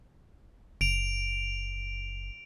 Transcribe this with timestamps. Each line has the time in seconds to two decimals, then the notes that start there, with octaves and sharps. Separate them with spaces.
0.81 F#1 D7 F7